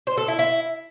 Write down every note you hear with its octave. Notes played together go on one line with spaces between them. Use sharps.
C5
A4
E4
E4